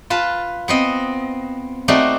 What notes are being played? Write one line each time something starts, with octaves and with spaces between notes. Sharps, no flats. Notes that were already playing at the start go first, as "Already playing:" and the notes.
F4 B4 A5
B3 C4 D#5
A3 C4 D#4 F#4 D5